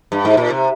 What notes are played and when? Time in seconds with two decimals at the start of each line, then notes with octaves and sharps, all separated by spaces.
0.12 G2
0.25 G#2
0.37 A#2
0.51 C3